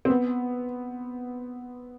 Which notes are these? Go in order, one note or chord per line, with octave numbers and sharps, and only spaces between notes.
C4
B3